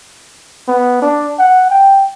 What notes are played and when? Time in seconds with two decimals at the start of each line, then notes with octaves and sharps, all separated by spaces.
0.68 B3
1.02 D4
1.39 F#5
1.70 G5